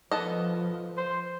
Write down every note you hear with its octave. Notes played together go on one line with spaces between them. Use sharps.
F3 B3 A4 D#5
C5